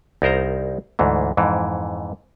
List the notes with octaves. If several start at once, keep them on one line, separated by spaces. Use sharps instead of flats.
C2 D#4 A#4 C5 A#5
D2 G#2 E3
F2 G#2 E3